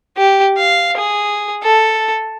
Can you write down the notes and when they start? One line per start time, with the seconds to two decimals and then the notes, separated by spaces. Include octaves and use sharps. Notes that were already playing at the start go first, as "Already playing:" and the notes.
0.18 G4
0.57 F5
0.97 G#4
1.63 A4